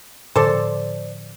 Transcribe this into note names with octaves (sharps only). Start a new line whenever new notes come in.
A2 D3 F3 A4 C5 D5